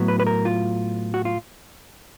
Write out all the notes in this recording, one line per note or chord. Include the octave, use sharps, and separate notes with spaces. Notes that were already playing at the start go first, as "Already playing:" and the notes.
Already playing: A2 F#3 B3
B4
B4
A#4
F4
F#4
F4